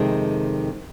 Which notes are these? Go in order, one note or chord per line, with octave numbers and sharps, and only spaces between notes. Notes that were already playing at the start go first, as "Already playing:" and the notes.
Already playing: F2 C3 D#3 G#3